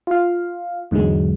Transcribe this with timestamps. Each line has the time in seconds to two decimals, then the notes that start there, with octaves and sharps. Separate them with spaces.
0.07 F4 F5
0.91 E2 G#2 D3 F#3 G#3